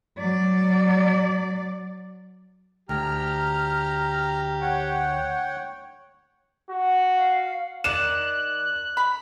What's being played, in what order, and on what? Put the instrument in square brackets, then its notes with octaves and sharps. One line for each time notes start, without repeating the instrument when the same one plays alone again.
[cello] F#3 D5
[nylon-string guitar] D2 [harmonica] G4 [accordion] A#5 F6
[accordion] C#5 F#5 G5
[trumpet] F#4
[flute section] F5
[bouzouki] D#3 D5 [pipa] A#3 [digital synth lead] F#6 [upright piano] E7
[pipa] B5